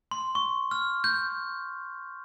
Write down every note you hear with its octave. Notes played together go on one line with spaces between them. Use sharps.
C6
C#6
F6
G6